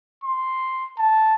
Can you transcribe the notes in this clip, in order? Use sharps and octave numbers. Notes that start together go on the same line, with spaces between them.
C6
A5